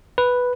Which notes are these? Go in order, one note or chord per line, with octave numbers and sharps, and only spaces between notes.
B4